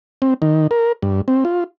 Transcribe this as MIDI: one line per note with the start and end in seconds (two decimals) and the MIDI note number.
0.22 0.34 60
0.42 0.67 51
0.71 0.92 70
1.02 1.21 43
1.28 1.44 60
1.45 1.64 65